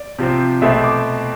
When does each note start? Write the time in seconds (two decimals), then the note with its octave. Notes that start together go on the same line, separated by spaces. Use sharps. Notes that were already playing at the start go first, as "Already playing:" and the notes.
Already playing: D5
0.19 C3 F3 C4
0.62 B2 A3 C4 E5
0.72 E5
0.84 D6